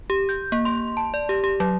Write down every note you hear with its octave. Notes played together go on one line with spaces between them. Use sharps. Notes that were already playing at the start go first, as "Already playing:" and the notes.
G4
G6
A#3
C6
A5
D5
G4
G4
F#3